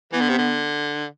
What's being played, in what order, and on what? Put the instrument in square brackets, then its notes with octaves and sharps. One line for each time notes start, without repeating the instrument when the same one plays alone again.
[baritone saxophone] E3 [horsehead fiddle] B3
[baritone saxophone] D3
C3
D3